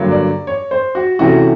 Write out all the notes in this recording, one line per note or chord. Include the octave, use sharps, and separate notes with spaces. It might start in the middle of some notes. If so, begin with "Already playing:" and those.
Already playing: G2 D3 F#3 A#3
D5
C#5
C5
F#4
C3 E3 A3 C#4 F#4